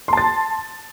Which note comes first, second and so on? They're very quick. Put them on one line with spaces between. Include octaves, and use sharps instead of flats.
C6 A5 A6